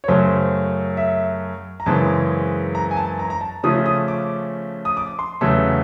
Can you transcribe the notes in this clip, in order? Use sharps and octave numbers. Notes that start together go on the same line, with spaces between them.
C#5
F#2 C#3 F#3 A3 C5
E5
A#5
F#2 C#3 E3 G#3 C4 A5
A#5
G#5
A5
A#5
A#5
A5
C#3 F3 A3 C#4 D#6
D#6
D6
D#6
D6
C6
E2 C#3 F#3 A3 E6